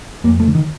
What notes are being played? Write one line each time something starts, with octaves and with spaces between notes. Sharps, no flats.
F2 A#3
A3
D3
D#3